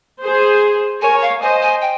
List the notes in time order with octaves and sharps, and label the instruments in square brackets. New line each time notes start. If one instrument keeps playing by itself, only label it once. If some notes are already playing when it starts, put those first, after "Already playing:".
[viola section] G#4 C5
[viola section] A#4 C#5 [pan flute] G#5
[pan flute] F5
[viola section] C5 D#5 [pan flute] G#5
[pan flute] G#5
G5